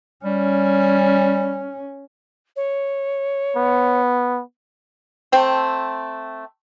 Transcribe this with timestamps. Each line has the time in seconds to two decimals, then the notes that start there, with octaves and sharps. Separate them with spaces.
0.25 G3 C#4
2.56 C#5
3.56 B3
5.32 A3 C4 G5